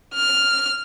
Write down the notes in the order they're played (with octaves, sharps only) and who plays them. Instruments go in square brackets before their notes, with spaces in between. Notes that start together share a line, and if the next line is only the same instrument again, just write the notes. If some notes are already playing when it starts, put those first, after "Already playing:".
[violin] F6